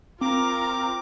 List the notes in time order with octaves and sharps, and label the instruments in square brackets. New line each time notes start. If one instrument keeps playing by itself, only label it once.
[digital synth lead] C4 [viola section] F4 A#5 [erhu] A#4 [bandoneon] D6